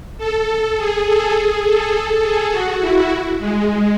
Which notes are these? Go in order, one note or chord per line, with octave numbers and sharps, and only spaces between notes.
A4
G#4
A4
G#4
A4
G#4
F#4
E4
G#3